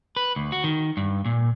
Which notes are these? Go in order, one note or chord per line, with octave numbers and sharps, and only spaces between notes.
B4
D2
F#4
D#3
G2
A#2